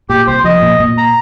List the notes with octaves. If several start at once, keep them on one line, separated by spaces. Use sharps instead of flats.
A#2 G4
C2 C5
F3 D#5
A#2
A#2
A#5